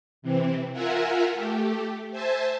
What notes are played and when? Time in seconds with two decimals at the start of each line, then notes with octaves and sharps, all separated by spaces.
0.22 C3 E3 C4
0.73 F4 A#4 E5 F#5 G#5
1.34 A3 G4
2.11 C5 E5 G#5 A5